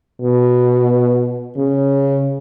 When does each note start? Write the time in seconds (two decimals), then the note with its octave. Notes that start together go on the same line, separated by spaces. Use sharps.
0.21 B2
1.56 C#3